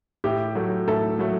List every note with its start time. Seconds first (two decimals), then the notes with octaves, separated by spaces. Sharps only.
0.24 A2 G4
0.55 F#3 A3
0.87 A2 A4
1.19 F#3 A3